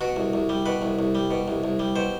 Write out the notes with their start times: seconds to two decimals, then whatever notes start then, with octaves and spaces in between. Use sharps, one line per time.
0.01 B2 F#4
0.16 C2
0.33 C2
0.49 G3
0.66 B2 B4
0.82 C2
0.99 C2
1.15 G3
1.31 B2
1.48 C2
1.64 C2
1.79 G3
1.96 B2 C5